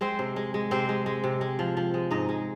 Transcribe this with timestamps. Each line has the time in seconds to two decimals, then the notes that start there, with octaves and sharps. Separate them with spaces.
0.01 G#3 C4 C5
0.19 C3
0.36 G#3
0.54 G#3
0.71 C3 C4 C5
0.89 G#3
1.06 G#3
1.24 C3
1.41 G#3
1.59 F3
1.77 F3
1.94 G#3
2.11 G#2 D#4 D#5
2.29 G#3